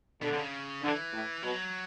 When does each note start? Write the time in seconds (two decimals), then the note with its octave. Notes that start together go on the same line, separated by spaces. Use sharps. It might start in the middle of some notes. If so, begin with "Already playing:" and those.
0.22 B2 D3
0.33 B2
0.37 C#3
0.83 D3 E3
1.13 A2
1.43 B2 F#3